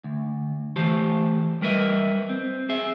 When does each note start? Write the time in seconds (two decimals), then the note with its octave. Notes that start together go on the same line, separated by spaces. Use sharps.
0.04 D2
0.76 E3 A3 G4 C5 A5
1.62 G3 A#4 B4 D#5 E5
2.29 C4
2.69 G#4 E5